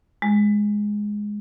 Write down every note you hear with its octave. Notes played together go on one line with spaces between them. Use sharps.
G#3